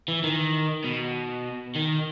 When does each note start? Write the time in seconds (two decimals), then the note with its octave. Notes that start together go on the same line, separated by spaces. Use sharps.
0.08 E3
0.24 D#3
0.84 B2
1.75 D#3